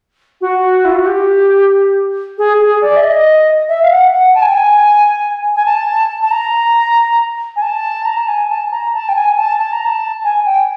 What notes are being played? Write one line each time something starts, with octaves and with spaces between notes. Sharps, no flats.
F#4
E4
F4
F#4
G4
G#4
G#4
D5
E5
D#5
E5
F5
F#5
F#5
A5
G#5
G5
G#5
G#5
A5
A5
A#5
G#5
A5
A#5
A5
G#5
A5
A#5
A5
G5
G#5
A5
A5
A#5
A5
G#5
G5